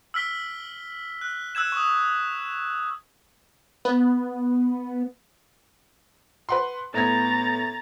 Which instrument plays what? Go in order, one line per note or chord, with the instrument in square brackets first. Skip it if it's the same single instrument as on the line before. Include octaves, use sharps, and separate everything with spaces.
[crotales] E6 F6 B6 G7
F#6
E6 F#6 G#6 E7
C#6 D#6
[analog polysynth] B3
[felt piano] B4 F#5 C6
[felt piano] A2 B3 G#6 [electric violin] A#5 A6